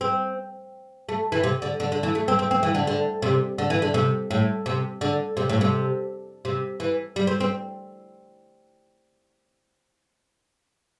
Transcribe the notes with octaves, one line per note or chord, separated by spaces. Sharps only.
C4
A3
E3
C3
D3
D3
D3
E3
A3
C4
C4
C4
E3
D3
D3
C3
D3
E3
D3
C3
A2
C3
D3
C3
A2
C3
C3
E3
G3
C4
C4